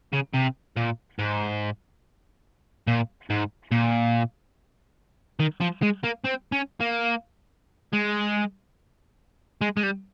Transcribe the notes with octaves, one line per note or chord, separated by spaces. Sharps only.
C#3
C3
A#2
G#2
A#2
G#2
A#2
D#3
F3
G#3
A#3
C4
C#4
A#3
G#3
G#3
G#3
G3